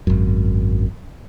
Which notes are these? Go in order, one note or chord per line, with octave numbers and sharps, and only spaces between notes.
G#1 F#2